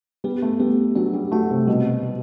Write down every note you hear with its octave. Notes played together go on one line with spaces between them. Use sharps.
G3 B3
A3
G3 B3
F#3 D4
G3
A3 F#4
C3
B2 G3
G3